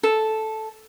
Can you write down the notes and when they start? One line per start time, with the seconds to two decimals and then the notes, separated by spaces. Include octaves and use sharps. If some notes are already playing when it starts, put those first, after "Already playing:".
0.03 A4